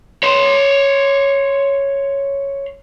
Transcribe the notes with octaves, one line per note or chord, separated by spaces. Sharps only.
C#5 C6